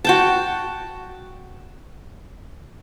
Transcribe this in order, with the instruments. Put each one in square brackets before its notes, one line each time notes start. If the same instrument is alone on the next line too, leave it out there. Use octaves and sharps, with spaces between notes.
[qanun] F#4 G5 A5